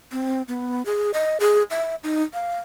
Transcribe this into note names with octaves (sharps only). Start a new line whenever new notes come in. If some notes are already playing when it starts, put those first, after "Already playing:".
C4
B3
G#4
D#5
G#4
E5
D#4
F5